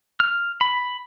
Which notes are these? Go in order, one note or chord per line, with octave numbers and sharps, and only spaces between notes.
F6
B5